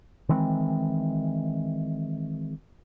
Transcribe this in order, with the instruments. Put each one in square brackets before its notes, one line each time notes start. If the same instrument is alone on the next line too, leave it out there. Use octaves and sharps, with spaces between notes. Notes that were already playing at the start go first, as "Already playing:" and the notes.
[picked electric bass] D#3 E3 G#3 C4